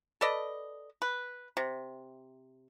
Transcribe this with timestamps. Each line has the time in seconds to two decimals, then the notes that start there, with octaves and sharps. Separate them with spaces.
0.21 A4 B4 D5 D#5
1.02 B4
1.57 C3